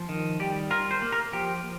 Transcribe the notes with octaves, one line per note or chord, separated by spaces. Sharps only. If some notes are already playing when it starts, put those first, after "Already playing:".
Already playing: F3
D#3
G3 G4
F4 A#4
C5
A#3
A#4
F3 G4